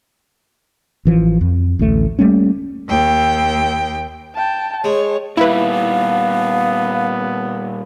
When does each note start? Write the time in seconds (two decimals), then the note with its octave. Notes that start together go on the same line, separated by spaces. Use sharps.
1.05 A1 E3 F3
1.41 F2
1.79 A1 D2 A3
2.19 G3 A3 A#3 C#4
2.88 D#2 G5
4.35 G5 A5
4.84 G#3 C#5
5.37 A#2 G3 B3 E4 B4 F5